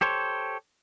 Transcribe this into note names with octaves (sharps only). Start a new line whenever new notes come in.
G4 A4 C5 C#5